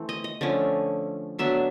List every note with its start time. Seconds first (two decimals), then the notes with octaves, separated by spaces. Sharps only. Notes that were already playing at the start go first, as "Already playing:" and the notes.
Already playing: E3 A3 C4
0.09 D#5
0.24 D#5
0.41 D3 F3 A3 C#4
1.39 D3 F#3 B3 D4 E5